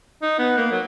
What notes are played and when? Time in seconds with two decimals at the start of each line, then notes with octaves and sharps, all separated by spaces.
0.22 D#4
0.39 B3
0.57 A#3
0.72 F#3